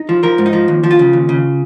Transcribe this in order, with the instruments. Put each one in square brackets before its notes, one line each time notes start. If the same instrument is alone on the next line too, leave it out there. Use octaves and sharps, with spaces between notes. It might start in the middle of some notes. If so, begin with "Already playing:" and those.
Already playing: [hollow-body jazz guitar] D#4
F3
F3 A#4
G#2
D#4
F3
D#2
F3
F4
C#3
D#2
C#3